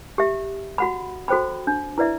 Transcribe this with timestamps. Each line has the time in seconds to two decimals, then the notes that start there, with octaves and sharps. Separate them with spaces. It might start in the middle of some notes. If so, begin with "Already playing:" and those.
0.18 G4 E5
0.78 F#4 F#5 B5
1.28 F#4 A4 C5 G5 B5
1.67 D4
1.98 E4 B4 D5 E5